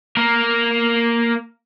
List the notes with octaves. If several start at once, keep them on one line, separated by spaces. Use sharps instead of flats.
A#3 A#4